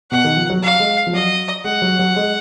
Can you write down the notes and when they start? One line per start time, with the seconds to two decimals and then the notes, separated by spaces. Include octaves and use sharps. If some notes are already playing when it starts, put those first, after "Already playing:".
0.11 B2 F#5
0.24 D#3
0.37 F3
0.50 F#3
0.63 F#3 F5
0.80 G#3
1.07 F3
1.13 F#3 D#5
1.64 G#3 F#5
1.82 F#3
1.99 F#3
2.16 G#3